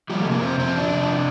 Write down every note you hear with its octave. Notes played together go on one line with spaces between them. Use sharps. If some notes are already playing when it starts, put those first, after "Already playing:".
F3 G3
A3
C3
A#3
F2 C4
F2 C4
F3 D4
C3